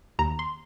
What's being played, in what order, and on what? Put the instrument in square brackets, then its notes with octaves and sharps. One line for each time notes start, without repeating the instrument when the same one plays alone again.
[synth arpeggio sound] D#2 A#5
C6